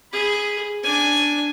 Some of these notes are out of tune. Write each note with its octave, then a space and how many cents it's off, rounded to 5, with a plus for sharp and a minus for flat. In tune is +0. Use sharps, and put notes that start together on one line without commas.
G#4 +0 B5 +0
D4 +0 G#5 +0